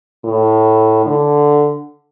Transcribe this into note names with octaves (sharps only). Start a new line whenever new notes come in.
A2
D3